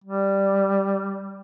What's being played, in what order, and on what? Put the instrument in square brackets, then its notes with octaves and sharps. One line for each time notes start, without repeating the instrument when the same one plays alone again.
[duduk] G3